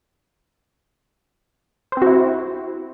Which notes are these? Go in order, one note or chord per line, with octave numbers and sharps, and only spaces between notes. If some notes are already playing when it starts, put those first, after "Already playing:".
C4 E4 F#4 C5